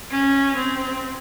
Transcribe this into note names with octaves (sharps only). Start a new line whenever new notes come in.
C#4
C4